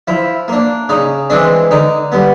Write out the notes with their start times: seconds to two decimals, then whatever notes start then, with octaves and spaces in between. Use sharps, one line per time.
0.07 F3 E4
0.48 A#3 D4
0.89 C#3 D#4
1.30 E3 G#3 C4 D4
1.71 D3 D#4
2.12 G3 B3